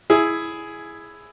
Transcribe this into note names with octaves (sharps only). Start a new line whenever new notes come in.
E4 G#4